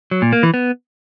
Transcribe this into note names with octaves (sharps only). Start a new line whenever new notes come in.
F#3
A#2
A#3
E3
B3